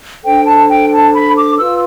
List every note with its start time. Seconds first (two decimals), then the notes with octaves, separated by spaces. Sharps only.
0.25 D4 A4 C5 G5
0.47 A5
0.70 G5
0.92 A5
1.14 B5
1.36 D6
1.58 F4 B4 E6